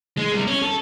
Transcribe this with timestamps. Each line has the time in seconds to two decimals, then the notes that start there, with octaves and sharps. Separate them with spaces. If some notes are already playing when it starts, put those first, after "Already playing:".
0.17 G#3
0.32 C3 G3
0.47 C#4
0.62 A4